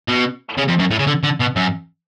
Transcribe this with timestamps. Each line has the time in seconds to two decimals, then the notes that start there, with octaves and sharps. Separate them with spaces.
0.08 B2
0.57 C#3
0.68 F2
0.79 F#2
0.91 A2
0.99 C#3
1.07 D3
1.24 D3
1.40 B2
1.56 F#2